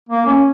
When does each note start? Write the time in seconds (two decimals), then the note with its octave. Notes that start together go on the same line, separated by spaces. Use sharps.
0.09 A#3
0.26 C#4